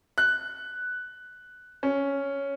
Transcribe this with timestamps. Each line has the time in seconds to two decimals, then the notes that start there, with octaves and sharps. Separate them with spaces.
0.18 F#6
1.83 C#4